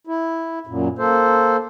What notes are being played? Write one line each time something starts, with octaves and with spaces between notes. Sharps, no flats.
E4
F#2 A#2
A#3 A4 C5